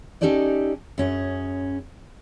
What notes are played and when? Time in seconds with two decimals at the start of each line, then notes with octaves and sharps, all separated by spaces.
0.21 C#4 D#4 G4 A4 D5 D#5
0.98 F#2 C#4 G#4